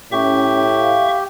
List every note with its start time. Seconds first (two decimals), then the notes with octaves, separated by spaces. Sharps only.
0.12 A2 C#4 G4 E5 C#6
0.79 F5